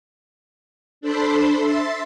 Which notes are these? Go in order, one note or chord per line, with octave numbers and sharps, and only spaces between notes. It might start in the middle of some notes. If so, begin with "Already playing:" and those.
D4 A4 C5 B5 C6
E5 C6 A6